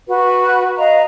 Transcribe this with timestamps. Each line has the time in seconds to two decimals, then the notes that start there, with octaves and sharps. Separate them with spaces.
0.08 F#4 B4
0.78 D#5 F5 A#5